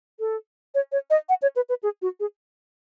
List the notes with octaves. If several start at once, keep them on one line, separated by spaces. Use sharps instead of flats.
A4
C#5
C#5
D#5
F#5
C#5
B4
B4
G#4
F#4
G#4